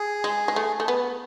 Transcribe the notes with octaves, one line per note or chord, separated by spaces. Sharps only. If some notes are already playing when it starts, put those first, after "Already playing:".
Already playing: G#4
G#3
G#3
A3
A3
B3